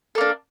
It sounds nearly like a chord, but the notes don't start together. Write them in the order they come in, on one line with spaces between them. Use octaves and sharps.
A4 A#3 D4